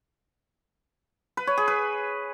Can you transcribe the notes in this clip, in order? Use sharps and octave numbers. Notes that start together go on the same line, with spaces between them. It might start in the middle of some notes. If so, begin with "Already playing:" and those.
B4
C#5
G#4
B4